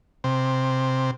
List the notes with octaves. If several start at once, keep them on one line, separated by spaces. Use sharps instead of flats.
C3